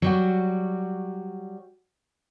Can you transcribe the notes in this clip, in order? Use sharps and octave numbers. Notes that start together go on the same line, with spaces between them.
F#3 G3 F#4